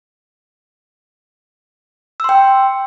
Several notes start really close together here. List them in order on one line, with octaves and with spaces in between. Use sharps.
E6 C6 G5